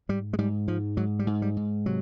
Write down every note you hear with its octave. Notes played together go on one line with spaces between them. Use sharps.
G#2 G3
G#3
G#2 G3
G#2 F3
G#2 F#3
G3
G#2
G3
G#2
C3 F#3